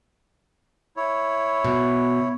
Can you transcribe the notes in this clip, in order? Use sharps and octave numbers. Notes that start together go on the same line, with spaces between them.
E4 C#5
B2